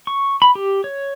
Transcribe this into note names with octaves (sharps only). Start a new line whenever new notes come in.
C#6
B5
G4
C#5